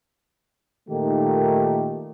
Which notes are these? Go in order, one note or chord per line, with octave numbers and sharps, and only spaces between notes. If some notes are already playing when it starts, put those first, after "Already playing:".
A#2 D#3 A3 A#3 D#4 G4